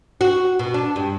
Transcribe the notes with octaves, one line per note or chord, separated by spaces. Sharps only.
F#4
B2
D4
G2